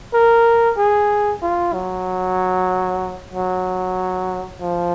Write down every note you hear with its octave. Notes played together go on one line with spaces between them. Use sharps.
A#4
G#4
F4
F#3
F#3
F3